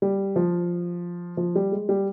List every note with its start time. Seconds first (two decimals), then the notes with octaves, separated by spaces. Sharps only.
0.02 G3
0.36 F3
1.37 F3
1.55 G3
1.72 G#3
1.89 G3